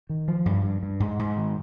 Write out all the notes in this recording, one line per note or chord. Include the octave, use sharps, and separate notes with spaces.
D#3
F3
G2
G2
G2
G#2
G#2
D#3